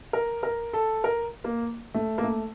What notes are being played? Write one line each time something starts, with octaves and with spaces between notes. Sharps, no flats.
A#4
A#4
A4
A#4
A#3
A3
A#3
A3